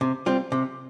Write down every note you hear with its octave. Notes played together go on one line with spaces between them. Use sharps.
C3
G3 C4 F4
C3